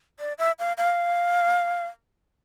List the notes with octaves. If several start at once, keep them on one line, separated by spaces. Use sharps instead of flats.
D5
E5
F5
F5